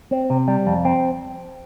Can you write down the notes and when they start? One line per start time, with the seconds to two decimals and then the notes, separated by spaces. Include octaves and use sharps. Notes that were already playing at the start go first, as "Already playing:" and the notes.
0.11 C4
0.30 C3
0.48 G3
0.67 F2
0.85 C4